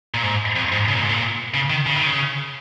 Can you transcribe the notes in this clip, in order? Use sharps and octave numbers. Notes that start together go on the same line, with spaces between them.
A#2
G#2
F2
G#2
C#3
A#2
G#2
A#2
C#3
D#3
C#3
D#3
C#3